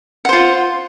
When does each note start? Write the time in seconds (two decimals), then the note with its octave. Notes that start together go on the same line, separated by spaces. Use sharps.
0.25 F#5
0.29 C5
0.33 F4